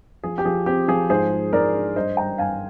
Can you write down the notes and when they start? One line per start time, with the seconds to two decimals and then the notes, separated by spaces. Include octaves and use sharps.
0.24 F3 G#4
0.38 G4
0.45 F3 G#4
0.66 C4 G4
0.88 F3 G#4
1.10 G#2 G#4 C5
1.31 F4
1.53 G#2 A#4 D5
1.75 D4
1.95 G2 C5 D#5
2.17 G3 G5 A#5
2.38 G2 F5 G#5